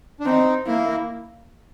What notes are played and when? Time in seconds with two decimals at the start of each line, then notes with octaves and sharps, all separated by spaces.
0.20 D4
0.25 C4 D#4
0.67 A#3 E4